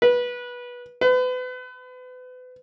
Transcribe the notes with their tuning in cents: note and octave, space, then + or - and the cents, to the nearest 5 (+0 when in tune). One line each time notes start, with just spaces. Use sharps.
B4 -20
B4 +35